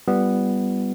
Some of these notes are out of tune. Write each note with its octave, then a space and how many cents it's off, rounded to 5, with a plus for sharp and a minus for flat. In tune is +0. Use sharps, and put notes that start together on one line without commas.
G3 +0 B3 +0 F4 -30